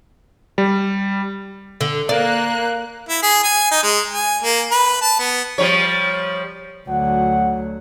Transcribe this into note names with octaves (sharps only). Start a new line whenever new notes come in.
G3
D3
A#3 D5 F#6
E4
G#4
G#5
D#4
G#3
G#5
A#3
B4
A5
B3
F3 G3 C#5
D2 F#3 F#5